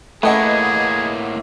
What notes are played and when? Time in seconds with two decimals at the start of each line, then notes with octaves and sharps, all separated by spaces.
0.23 A2 A3 A#3 G#4 B4 D#5 F#5